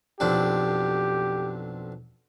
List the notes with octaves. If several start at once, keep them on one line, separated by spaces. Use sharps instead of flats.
B1 F2 D4 G4